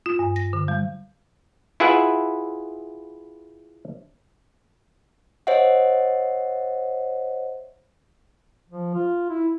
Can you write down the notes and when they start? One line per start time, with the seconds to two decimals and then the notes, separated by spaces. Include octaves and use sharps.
0.06 F4
0.19 G2
0.36 A#6
0.53 D3
0.68 G3
1.80 E4 F4 G#4 B4 E5 F#5
5.47 C5 C#5 D#5 E5 F#5
8.69 F3
8.95 F4
9.30 E4